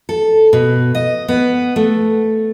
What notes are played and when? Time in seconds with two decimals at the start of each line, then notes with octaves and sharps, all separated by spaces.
0.09 A4
0.53 B2
0.95 D#5
1.28 B3
1.76 A3